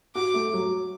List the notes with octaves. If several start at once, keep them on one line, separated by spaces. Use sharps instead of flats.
F#4 D6
A3
F#3